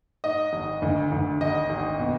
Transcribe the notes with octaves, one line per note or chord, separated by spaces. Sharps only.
G#2 D#5
G#1
D2
D2
G#1 D#5
G#1
B2